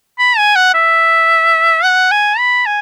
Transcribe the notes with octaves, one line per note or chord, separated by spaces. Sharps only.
B5
G#5
F#5
E5
F#5
G#5
B5
G#5